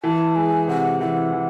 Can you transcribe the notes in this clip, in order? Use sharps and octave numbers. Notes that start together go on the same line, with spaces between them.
E3 A5
G#3 G#5
C3 F#5
E3 F#5
E3